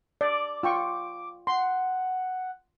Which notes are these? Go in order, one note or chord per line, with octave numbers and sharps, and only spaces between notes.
D5 D6
F4 G5 C#6
F#5 C6